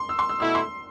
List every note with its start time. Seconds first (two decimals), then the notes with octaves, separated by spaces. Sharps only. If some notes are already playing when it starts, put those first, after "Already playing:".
Already playing: C6
0.09 E6
0.19 C6
0.29 E6
0.40 B2 A3 E4 E6
0.55 C6